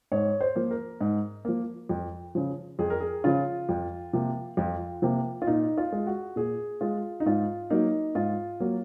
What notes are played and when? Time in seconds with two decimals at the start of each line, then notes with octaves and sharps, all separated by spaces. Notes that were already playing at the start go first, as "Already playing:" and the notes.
0.12 G#2 C#5
0.41 C5
0.56 F3 A#3
0.71 A#4
1.01 G#2
1.45 F3 A#3
1.89 F2
2.35 C#3 F3
2.79 F2 G#4
2.90 A#4
3.01 G#4
3.24 C#3 F3 F4
3.69 F2
4.13 C3 F3 A#3
4.57 F2 F4
5.02 C3 F3 A#3
5.42 F4
5.47 A#2 D#4
5.78 F4
5.92 G#3
6.07 F#4
6.36 A#2 G#4
6.81 G#3 F4
7.20 D#4
7.26 G#2 F4
7.70 F#3 A#3 D#4
8.15 G#2 F4
8.60 F#3 A#3